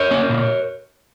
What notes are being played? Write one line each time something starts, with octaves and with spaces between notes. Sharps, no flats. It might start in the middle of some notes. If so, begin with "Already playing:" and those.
Already playing: A#4 C#5
A#3 C#4
A#2